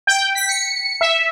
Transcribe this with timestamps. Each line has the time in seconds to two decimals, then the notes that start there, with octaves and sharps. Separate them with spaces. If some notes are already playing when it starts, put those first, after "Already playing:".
0.07 G5
0.35 B6
0.49 C#7
1.01 E5